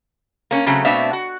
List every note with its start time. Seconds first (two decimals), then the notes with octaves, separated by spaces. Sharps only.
0.51 A#3 C#4
0.66 C#3 F#3 A3 C4
0.85 B2 A3 C4 D4 E5 F5
1.13 F#4